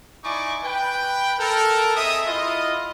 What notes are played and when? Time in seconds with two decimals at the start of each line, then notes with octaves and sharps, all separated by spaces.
0.24 D#4 E4 D5 G#5 C#6 D6
0.65 B4 G5
1.39 A4 A#4
1.96 C4 G#4 D#5 E5 D#6
2.27 E4 F4 D#5